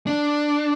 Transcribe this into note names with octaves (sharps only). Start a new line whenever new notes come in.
D4